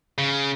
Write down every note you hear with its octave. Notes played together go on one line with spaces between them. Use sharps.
C#3